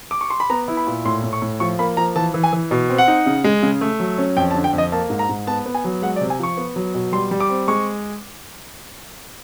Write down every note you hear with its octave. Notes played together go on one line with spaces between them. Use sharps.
D6
C#6
C6
B5
B3 A#5
E4
B5
A#2
A2 C6
A2
C#6
A2
F3 C#6
A#3 B5
F3 A#5
E3 A5
E3
G#5
E3
B2
C4
F#5
D#4
C#3
G#3
C#3
A3
F#3
C#4
F2 G5
A5
D3
G5
F2
D#5
A#3 A5
G#2
A#5
G#2
B3 A5
B3
G#5
F#3
G#3 F#5
D5
C3
G#5
F3 C#6
B3
F#3
B2
G3 C6
G3
D6
C4
G#3 C#6